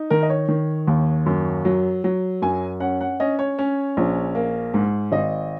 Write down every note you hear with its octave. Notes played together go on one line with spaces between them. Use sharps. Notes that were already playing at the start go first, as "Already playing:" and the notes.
Already playing: D#4
D#3 A#4
D#5
C#5
D#3
D#2
F#2
F#3
F#3
F#2 G#5
C#4 F#5
F#5
C#4 D#5
C#5
C#4
A#1
A#3
G#2
G#1 D#5